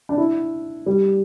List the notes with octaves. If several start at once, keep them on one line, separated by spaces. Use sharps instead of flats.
D4
E4
G3